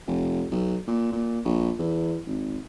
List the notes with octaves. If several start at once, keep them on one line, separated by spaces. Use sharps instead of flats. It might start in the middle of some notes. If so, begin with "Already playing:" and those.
F1
B1
A#2
A#2
A#1
E2
G#1